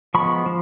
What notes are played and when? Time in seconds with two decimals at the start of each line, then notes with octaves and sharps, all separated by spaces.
0.14 F3 G#3 B3 B5 C#6
0.46 F3